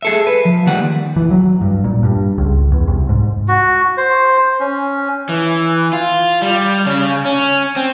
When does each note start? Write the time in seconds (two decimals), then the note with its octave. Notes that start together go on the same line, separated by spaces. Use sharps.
0.02 G#4 A4 E5
0.27 B4
0.45 F3
0.66 D#3 G3 A#3 F#5
1.16 E3
1.31 F#3
1.61 G2
1.84 A#2
2.03 G2
2.38 C#2
2.72 E2
2.87 C2
3.09 G#2
3.48 F#4
3.97 C5
4.60 C#4
5.29 E3
5.93 F4
6.42 G3
6.86 C#3
7.25 C#4
7.76 C4